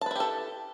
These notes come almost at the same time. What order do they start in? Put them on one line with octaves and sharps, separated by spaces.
A5 B4 E4 G4 A4